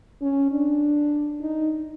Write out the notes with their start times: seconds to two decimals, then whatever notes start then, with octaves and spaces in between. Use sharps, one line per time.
0.22 C#4
0.51 D4
1.41 D#4